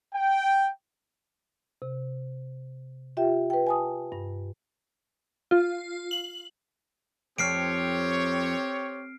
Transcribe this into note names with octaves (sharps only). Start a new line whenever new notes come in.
G5
C3
F4 G4 E5 G5
B4 G5
G#5 A5 D#6
G2
F4
F#7
F2 C4 G4 C#5 F6 C7 D7